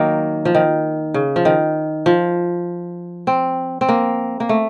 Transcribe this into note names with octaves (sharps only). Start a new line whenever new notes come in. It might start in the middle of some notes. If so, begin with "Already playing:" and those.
Already playing: D#3 F#3 A#3
F3
D#3
C#3
F3
D#3
F3
C4
C4
A#3
A#3
A3